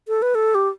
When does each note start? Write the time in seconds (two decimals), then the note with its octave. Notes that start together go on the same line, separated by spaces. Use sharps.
0.08 A4
0.22 B4
0.35 A4
0.55 G4